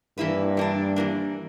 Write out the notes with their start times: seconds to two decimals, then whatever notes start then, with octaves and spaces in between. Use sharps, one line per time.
0.18 G2 E3 A#3 E4 B4
0.57 E3 A#3 D4
0.96 E3 A#3 D4